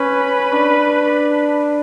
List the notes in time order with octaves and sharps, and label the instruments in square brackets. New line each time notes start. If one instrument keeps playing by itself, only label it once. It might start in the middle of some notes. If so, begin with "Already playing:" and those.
Already playing: [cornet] C#4 [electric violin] B4
[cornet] D4